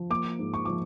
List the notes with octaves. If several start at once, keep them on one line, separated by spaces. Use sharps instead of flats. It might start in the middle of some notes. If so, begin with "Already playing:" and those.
Already playing: F3
A#3 D6
G#2
C#6
F3 D6